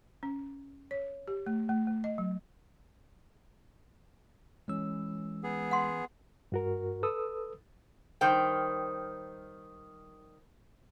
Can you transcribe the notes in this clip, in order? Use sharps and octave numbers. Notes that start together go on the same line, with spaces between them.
C#4
C#5
G4
A3
A3
A3
D#5
F#3
E3 G#3 C#4 E6
B3 G#4
F#5 C6
G2 F#4 A#4
A4 B4 D#6 E6
D#3 G3 C5 G5